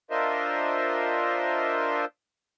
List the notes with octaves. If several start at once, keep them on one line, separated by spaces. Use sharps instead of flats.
D4 F4 A#4 C5 D#5 E5